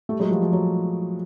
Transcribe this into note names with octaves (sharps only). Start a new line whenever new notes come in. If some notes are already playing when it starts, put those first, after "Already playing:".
G3 A3
F#3 G#3
F3 G3
F3
F#3